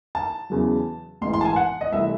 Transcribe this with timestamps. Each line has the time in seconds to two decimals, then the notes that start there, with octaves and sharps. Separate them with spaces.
0.15 A5
0.50 E2 C#3 F#3
1.21 A1 G#2 E3 C6
1.33 C6
1.41 A5
1.45 G#5
1.56 F#5
1.81 D#5
1.92 C2 C3 E3 A3 E5